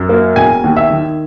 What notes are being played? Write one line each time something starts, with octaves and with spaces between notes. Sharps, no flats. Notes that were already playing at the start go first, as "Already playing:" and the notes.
Already playing: F#2
A#3
E1 G#5
D#2
E5
D#3